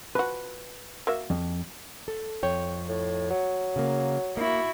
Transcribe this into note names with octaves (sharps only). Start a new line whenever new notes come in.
F3 F#4 B4
A#3 F#4 E5
F2
A4
F2 C#5 G5
A2
F#3
C#3 A#3
A#3 E4 F#4